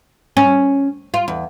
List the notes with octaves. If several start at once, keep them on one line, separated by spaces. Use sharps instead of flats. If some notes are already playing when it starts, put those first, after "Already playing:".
C#4
F4
E2